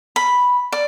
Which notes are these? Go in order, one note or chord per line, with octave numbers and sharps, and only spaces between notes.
B5
D5